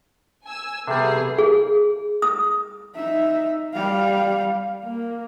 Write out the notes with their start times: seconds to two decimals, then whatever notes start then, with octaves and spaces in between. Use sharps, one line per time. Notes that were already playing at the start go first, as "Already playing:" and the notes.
0.45 G#5 E6
0.87 C3 G3 A3 B3 G#4 C7
1.39 G#4
2.22 D#6
2.95 D#4 E5
3.74 G3 F5
4.84 A#3